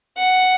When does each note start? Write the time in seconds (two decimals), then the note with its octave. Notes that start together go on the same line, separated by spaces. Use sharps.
0.18 F#5